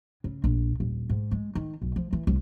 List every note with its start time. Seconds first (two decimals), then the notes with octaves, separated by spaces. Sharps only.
0.24 C#3
0.44 A#1
0.80 D#1
1.09 G#2
1.31 G#3
1.55 D#3
1.82 B1
1.96 F3
2.13 E3
2.27 C2